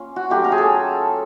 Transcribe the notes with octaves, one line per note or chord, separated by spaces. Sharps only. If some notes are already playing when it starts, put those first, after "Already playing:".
Already playing: A#3 C#4 F4
F#4
F#3 A3 C#4 F4 G4
A#4
G#4
A4